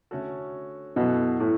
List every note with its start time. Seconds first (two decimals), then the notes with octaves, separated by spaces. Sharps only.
0.11 D3 A3 C#4 F#4 A4
0.96 F#2 B2 E3 B3 F#4 A4
1.40 A2